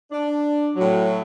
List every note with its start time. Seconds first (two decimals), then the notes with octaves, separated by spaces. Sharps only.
0.12 D4
0.76 A2 F#3